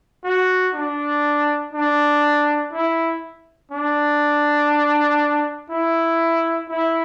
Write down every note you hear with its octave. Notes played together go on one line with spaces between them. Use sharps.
F#4
D4
D4
E4
D4
E4
E4